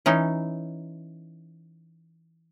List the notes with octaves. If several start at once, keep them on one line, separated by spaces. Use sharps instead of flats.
E3 C#4 D#4